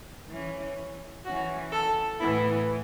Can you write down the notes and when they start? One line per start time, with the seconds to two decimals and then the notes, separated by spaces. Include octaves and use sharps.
0.30 E3 C#4
1.25 E3 C#4 F#4
1.72 A4
2.20 A2 E3 B3 E4